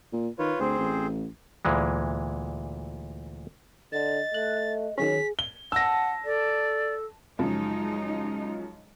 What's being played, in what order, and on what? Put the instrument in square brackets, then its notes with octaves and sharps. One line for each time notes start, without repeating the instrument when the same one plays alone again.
[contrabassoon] A#2
[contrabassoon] D#3 [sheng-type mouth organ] F4 B4 C#5
[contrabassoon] D2 [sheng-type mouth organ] C4 G#4 C5
[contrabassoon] A1
[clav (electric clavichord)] D2 A#2 E3 G#3
[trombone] D3 [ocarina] D#5 [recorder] A6
[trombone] A3 [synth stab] F#6
[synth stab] D#3 F#3 C#4 [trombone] G#4 [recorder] B6
[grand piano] G7
[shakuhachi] F#5 [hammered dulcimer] A5 [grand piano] E6 A#6
[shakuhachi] A4 [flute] D5
[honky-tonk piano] F#2 C#3 F3 [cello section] G#3 D#4